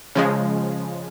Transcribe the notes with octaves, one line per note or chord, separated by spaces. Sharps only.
C#3 F3 G#3